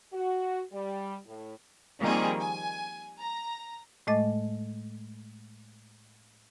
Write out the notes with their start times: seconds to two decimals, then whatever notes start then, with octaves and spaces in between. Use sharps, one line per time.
0.13 F#4
0.72 G3
1.27 A2
2.01 D#3 F3 G3 A#3 C4 G#4
2.39 G#5
3.20 A#5
4.07 A2 G#3 A3 D#5 D6 A6